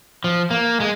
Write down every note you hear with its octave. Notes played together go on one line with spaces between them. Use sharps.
F3
A#3
G#3